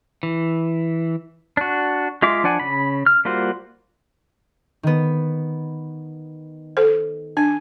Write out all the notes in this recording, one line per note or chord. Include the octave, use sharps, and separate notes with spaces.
E3
D4 F#4
G#3 F4 E5 D6
F3 D4 D5 F#5 G#5
C#3 B5
F6
G3 A#3 F4 F#4 C5
D#3 B3
A4 C5
D4 G#5